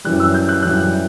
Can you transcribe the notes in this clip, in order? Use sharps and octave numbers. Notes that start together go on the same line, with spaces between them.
F#2 E3 G3 F#6
E6
G6
F#6
F#2 E3 G3 F#6